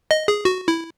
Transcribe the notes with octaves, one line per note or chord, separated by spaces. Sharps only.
D#5
G#4
F#4
E4